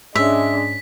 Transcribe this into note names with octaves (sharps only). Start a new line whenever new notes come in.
G#2 G#3 C#4 D4 E5 B6